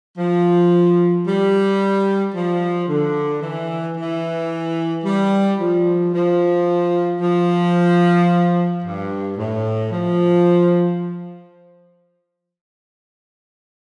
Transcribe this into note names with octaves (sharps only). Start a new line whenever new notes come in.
F3
G3
F3
D3
E3
E3
G3
F3
F3
F3
G2
A2
F3